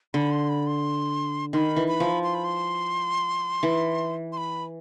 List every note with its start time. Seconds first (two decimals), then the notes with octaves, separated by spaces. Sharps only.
0.14 D3 B5
0.31 C6
0.49 B5
0.67 C6
1.53 D#3 C6
1.57 B5
1.76 E3
1.88 B5
2.00 F3
2.24 C6
2.34 B5
2.44 C6
3.63 E3
4.32 C6
4.37 B5